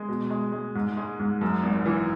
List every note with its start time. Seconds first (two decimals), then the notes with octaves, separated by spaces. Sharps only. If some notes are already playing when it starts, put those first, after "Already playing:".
Already playing: G#3
0.08 B2
0.30 G#3
0.52 G#3
0.75 G#2
0.97 G#3
1.19 G#2
1.41 F#2
1.63 G#1
1.86 E3